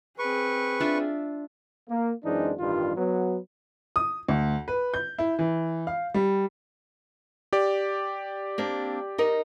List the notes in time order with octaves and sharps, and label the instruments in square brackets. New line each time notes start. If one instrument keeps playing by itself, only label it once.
[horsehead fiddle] C4 G#4 [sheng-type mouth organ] B4 C#6
[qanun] D4 F4 E5
[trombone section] A#3
F#2 E3 G#3 C4 D4 D#4
A1 G2 D#3 G3 F4
F#3 B3
[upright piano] D#6
D2
B4
G6
E4
E3
F5
G3
[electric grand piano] G4 D5
[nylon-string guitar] A#3 C4 D4
D#4 A#4 D#5